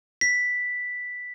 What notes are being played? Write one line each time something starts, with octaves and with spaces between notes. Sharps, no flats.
B6